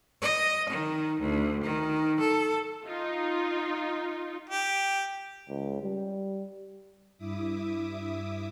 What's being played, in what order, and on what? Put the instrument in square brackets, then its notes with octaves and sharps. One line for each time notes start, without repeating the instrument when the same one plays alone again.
[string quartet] D#5
D#3
D2
D#3
A4
[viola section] D#4 F4
[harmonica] G4
[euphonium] C#2
G3
[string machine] G2 E4 E5 D6 D#6